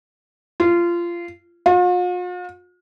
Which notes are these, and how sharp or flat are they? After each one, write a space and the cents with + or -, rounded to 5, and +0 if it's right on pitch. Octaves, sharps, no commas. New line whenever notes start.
F4 -20
F4 +45